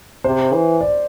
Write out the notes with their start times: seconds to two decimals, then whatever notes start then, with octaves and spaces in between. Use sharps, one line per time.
0.24 C3 C5
0.53 E3
0.81 D5